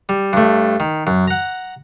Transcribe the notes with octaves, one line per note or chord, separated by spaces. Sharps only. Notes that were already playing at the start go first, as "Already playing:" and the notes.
G3
G2 A3
D#3
F#2
F#5 A#5